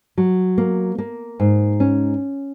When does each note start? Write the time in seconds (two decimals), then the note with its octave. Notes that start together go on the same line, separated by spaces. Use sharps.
0.18 F#3
0.58 A#3
0.98 A#3
1.40 G#2
1.80 C#4